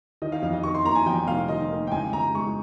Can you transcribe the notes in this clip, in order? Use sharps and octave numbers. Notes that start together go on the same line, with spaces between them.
D#3 D#5
F5
F2 F5
D#5
D#3 C#6
C6
A#3 A#5
G#5
F2 G5
F1 F5
D#3 D#5
A#3
G5
C#2 G#5
C#2 A#5
G#3 C#6